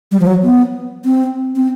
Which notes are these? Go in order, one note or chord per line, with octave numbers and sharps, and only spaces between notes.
G3
F3
F#3
B3
C4
C4